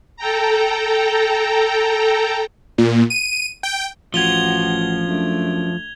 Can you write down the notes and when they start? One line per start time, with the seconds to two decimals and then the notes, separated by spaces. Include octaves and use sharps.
0.17 A4 G5 A#5
2.78 A#2
3.10 D#7
3.63 G5
4.14 A1 F3 F#4 G#6 F7 G7
5.08 F#2 A3 D4